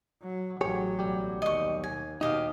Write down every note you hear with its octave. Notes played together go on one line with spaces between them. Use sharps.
F#3
A1 F#3 G4 G#4 C#5
B1 G3 G4
D#2 D#5 C#6
G#5
D#2 B2 D#4 G4 D#5 F5